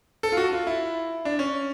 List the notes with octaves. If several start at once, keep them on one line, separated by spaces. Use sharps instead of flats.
A4
F4
F#4
F4
E4
D4
C#4